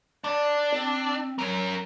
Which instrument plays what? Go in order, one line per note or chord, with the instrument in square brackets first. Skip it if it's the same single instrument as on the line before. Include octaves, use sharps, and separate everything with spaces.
[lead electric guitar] D4 [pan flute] D5
[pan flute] C4
[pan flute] F#3 [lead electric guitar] C#4 A#4